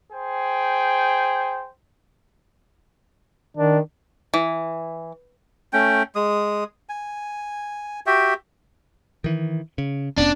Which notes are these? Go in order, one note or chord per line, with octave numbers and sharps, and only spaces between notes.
G#4 C5 G5
D#3 D4
E3
A3 C#4 G5
G#3 D#6
G#5
F#4 G4 E5 G5
D#3 E3
C#3
F1 B3 C#4 D4